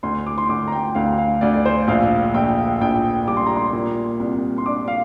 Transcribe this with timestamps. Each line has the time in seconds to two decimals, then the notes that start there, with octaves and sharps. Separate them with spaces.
0.03 D2 C6
0.26 D6
0.38 C6
0.49 D2 D6
0.68 A#5
0.72 G5
0.95 D2 F5
1.18 F5
1.41 D2 D5
1.54 D5
1.65 C5
1.88 A#1 F5
2.34 A#1 G5
2.81 A#1 G5
3.28 G3 D6
3.37 C6
3.46 A#5
3.56 C6
3.73 A#2
4.20 C2
4.58 C6
4.66 D4 D6
4.88 F5